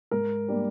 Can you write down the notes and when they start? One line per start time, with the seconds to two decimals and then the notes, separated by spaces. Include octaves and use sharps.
0.11 G#2 A#4
0.48 G3 A#3 D4